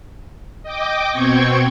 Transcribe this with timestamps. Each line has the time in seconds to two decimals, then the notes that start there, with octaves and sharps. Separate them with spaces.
0.63 D#5 G5 D6
1.11 B2 C4 G5 C#6 G#6